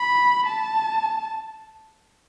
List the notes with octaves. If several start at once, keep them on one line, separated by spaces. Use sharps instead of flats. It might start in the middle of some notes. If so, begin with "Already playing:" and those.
Already playing: B5
A5